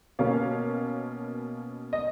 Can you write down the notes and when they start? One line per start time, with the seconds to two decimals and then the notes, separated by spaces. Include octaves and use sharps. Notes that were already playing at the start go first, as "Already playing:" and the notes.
0.19 B2 A#3 C#4 F5
1.93 D#5